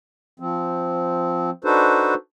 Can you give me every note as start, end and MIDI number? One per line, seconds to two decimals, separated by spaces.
0.40 1.50 53
0.40 1.50 60
1.64 2.14 62
1.64 2.14 63
1.64 2.14 66
1.64 2.14 69
1.64 2.14 71
1.64 2.14 72